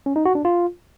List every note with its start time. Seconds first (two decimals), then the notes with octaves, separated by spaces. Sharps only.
0.06 C#4
0.16 D#4
0.25 F#4
0.35 D4
0.45 F4